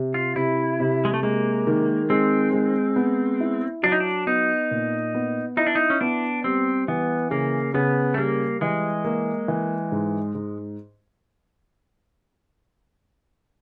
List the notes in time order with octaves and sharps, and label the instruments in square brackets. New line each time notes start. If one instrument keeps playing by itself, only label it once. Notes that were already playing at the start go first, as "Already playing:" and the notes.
Already playing: [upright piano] C3
[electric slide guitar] F4
[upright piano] C3 [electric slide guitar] E4
[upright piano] C3
[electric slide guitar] G#3
A3
[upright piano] G#3 [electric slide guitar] A#3
[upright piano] D#3
[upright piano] G#3 [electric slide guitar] C4
[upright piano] G#3
B3
E4
[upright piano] F#3 [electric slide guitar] D4
[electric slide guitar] D#4
D4
[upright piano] B3 [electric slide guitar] D#4
[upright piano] A#2
B3
[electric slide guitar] D#4 [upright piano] E4
[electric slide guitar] D4
D#4
C#4
[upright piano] B3 [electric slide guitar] D4
[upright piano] G3 [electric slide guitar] C4
[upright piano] E3 [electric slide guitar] B3
[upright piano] C#3 [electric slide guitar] A#3
[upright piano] C#3 [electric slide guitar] B3
[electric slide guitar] A3
[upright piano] G3 [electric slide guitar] A#3
[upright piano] E3 [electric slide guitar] G#3
[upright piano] A#3
E3
G#2
G#2